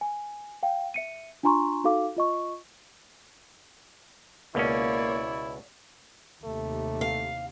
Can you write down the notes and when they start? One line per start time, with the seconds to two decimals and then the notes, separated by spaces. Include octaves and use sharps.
0.01 G#5
0.63 F5 G5
0.94 E5 C#7 D#7
1.43 D4 F4 G#5 A#5 C6 C#6
1.84 D#4 F#4 A4 F5 D6
2.16 F4 D#5 C#6
4.55 C#2 B2 A#3 C#4 E4 C#5 D5
6.44 D#2 C3 A3
7.01 F5